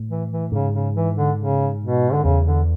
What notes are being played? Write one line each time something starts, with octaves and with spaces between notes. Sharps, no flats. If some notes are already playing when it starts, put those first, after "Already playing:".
Already playing: A2
E3
E3
G#2 C#3
C#3
E3
D3
C#3
B2
D3
E2 C#3
D3